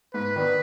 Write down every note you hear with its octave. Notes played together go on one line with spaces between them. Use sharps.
G#2 B4
D#3 B3 D4